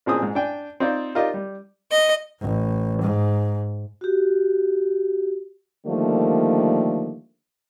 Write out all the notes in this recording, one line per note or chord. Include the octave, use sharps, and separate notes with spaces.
A1 A#2 C4 G#4 D#6
G#2
D4 G5 G#5
C4 D#4 F4 C5 D5
D#4 F4 G4 A#4 D5 D#5
G3
D#5
A1
G#2
F#4 G4
D3 D#3 F3 G3 A3 A#3